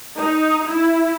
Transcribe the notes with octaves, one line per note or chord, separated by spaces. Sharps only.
D#4
E4